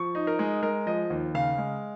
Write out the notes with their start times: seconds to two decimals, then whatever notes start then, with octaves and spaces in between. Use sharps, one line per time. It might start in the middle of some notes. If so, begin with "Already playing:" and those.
Already playing: F3 C#6
0.15 D#4
0.27 A#4
0.39 G#3
0.63 G#3 A#4
0.86 F3 D#5
1.10 D#2
1.34 C#3 F5
1.58 G#3